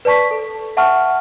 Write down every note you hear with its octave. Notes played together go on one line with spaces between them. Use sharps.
B4 D5 A5 C#6 B6
A4
E5 F#5 A5 C#6 F6